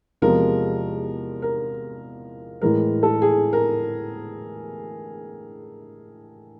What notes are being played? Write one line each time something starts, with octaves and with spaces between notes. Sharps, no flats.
E2 C3 F3 G#3 A#4
A#4
A2 E3 G#3 A#4
A4
G#4
A#4